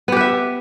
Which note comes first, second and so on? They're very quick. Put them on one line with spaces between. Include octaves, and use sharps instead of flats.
B3 G4 B4 E5